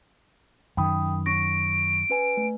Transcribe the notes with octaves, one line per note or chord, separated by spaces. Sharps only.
F#2 D#3 G5 B5 D#6
C#4 C#6 A#6 D7
C#4 B4 G#5
A3